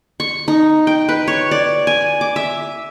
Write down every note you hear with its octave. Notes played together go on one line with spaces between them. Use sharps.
C#6
D#4
G5
B4
C#5
D5
G#5
D6
E5